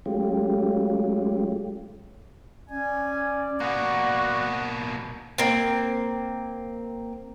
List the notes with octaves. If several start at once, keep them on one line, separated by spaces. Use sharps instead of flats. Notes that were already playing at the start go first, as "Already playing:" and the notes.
F#3 G#3 A3 C#4 F4 G4
C#4 D5 G#5
B2 A#3 F#4 F#5
A#3 C4